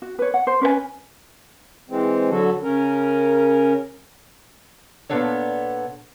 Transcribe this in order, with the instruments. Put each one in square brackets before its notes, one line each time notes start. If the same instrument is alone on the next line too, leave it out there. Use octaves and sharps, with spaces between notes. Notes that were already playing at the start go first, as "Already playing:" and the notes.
[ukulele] F#4
B4 C#5
F#5
C5
C#4 B4 C5 G#5
[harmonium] E3 G#3 C4
D3 F#3 F#4 A4
C#3 C#4 A#4
[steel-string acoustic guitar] A#2 B3 C4 D4 A4 C#5